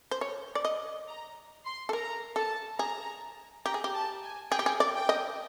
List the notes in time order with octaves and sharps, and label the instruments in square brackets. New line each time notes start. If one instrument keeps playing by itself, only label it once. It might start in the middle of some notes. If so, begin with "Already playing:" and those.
[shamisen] C5
C#5
D5
D#5
[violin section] A#5
C6
[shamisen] A4
[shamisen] A#4 [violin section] A#5
[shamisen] A4 [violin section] A5
[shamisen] G#4 [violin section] A#5
[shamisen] G4 [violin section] A#5
[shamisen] G#4
G4
[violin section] A5
G#5
[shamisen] G#4 [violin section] G5
[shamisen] G4
G#4
D5
[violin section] G5
[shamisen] D#5